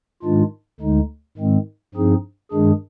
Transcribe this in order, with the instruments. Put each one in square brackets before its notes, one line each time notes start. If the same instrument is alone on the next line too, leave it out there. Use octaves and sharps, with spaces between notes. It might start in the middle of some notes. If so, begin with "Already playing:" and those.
[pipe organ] G#2 D#3 G#3 D4 F4
D2 D3 G#3 D#4
G#2 D#3 G#3 C4
G2 F3 C4 D#4 G#4
G2 D#3 G#3 D4 G#4